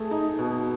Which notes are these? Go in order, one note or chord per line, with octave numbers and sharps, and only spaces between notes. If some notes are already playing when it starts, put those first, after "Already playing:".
Already playing: A3 G#4
D#4
B2